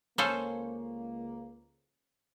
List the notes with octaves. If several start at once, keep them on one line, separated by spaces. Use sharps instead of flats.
C#2 A#3 C#4 A4 C5